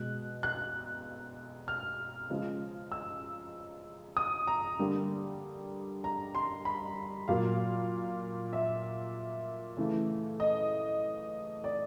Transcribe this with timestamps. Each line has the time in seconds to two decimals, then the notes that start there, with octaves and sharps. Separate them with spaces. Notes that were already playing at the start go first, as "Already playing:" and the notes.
Already playing: B2 G#3 F#6
0.43 F#6
1.68 F6
2.30 C#3 F3 G#3
2.92 E6
4.17 D#6
4.47 A#5
4.79 D3 G3 A#3
6.04 A#5
6.35 C6
6.65 B5
7.28 A#2 F#3 A#3 F5
8.53 E5
9.77 C#3 E3 A3
10.40 D#5
11.64 D5